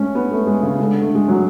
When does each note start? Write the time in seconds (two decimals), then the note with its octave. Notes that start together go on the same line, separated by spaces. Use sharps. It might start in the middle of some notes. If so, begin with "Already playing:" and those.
Already playing: G#3 A3 C#4
0.15 B3
0.31 A3
0.47 G#3
0.63 C#3
0.79 D3
1.00 A3
1.15 G#3
1.28 F#3